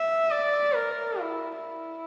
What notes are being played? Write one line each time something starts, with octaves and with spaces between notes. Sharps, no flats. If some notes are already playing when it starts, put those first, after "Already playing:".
Already playing: E5
D5
A#4
E4
E4